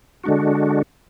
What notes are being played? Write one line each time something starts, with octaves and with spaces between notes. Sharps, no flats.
D3 G#3 D4 F#4